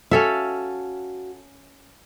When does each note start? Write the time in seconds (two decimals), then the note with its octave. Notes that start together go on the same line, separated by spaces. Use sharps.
0.11 C#4 F#4 A4 E5 F5